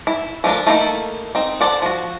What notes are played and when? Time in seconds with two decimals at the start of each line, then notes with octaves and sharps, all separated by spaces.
0.07 E4
0.44 F3 A3 D4 A#4
0.67 A3 A#3 D#4 E4 A4
1.35 C4 D#4
1.61 A4 C5 D5 F#5
1.82 F3 F#4